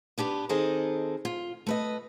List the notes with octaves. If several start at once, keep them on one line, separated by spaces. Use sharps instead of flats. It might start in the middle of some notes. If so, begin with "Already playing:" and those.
B3 D4 G4 B4
D#3 C4 G#4 A4 C5 D#5
F4
A3 B4 D#5